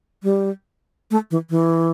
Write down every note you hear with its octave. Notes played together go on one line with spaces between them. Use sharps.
G3
A3
E3
E3